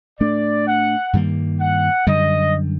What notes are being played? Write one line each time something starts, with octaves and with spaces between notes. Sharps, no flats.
A2 A3 D4 D5
F#5
G2 D#3 G3 A#3
F#5
F#2 D3 G3 D#5